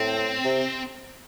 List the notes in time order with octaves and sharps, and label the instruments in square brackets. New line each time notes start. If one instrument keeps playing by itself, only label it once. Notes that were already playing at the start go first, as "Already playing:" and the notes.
Already playing: [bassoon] A2 [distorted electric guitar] C4
[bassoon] C3